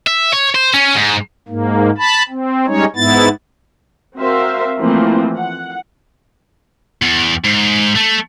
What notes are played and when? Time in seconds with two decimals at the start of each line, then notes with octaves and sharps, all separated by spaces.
0.07 E5
0.33 C#5
0.55 C5
0.74 C#4
0.95 G#2
1.48 G#2 A#3
1.98 A5 B5
2.29 C4
2.67 G3 G#3 C#4 D#4 C#5
2.96 G#2 B3 E4 A6
4.17 C4 F#4 A#4 C5 E5 F5
4.79 E3 F3 A3 A#3 C4
5.37 F#5
7.02 E2
7.44 G#2
7.96 A3